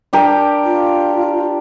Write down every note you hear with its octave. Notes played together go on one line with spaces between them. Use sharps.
D4 G4 A#4
F4